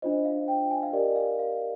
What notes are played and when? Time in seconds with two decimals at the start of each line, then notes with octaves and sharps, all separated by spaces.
0.02 D4 F4 C5 D#5
0.25 F5
0.48 G5
0.71 G#5
0.83 F5
0.93 G4 A#4 D5 D#5
1.16 F5
1.39 F5